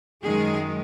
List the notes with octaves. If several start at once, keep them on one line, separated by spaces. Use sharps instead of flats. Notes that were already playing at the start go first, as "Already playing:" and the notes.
F#2 D#3 G#3 G#4